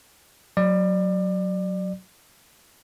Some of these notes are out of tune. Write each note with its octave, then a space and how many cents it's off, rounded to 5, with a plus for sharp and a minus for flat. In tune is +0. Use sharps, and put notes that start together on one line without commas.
F#3 +0 D5 +30